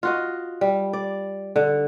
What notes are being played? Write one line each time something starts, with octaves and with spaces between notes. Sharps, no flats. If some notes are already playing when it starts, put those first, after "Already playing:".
F4 F#4 D#5
G3
D5
D3